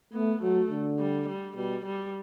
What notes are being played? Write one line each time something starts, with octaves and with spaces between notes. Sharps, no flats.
A3 B3
F#3 A3
D3
G3
G3
B2 G3
G3